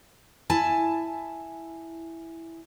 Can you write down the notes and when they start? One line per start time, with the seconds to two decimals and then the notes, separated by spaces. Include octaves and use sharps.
0.50 E4 G#5 A5